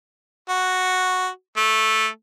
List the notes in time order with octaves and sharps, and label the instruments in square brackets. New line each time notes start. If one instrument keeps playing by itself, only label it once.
[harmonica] F#4
A3